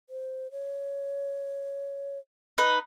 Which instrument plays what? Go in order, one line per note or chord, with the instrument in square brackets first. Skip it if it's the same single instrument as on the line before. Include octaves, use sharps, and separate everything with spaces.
[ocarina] C5
C#5
[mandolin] D#4 B4